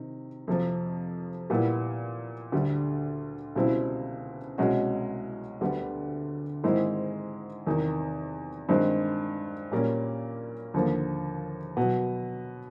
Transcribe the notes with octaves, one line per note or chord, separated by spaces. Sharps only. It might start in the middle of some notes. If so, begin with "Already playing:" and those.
Already playing: C3 D#3
F2 C3 F3
A#2 G3 B3 E4
D2 D3 G3
C#2 B2 G3 C4 E4
C2 B2 G#3 C#4 F#4
D2 D3 G3 B3
G#2 D#3 G#3 C4 E4
E2 C3 D#3
G2 D#3 G#3 C4
A#2 G3 A#3 C#4
D#2 D3 F3 A#3
B2 F#3 B3